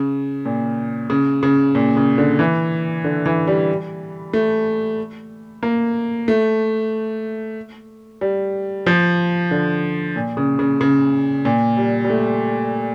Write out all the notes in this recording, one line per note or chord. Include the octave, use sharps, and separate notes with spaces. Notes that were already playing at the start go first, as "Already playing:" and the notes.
Already playing: C#3
A#2
C#3
C#3
A#2
C#3
D3
E3
D3
E3
G3
A3
A#3
A3
G3
F3
D3
A#2
C#3
C#3
C#3
A#2
G3
G3
A3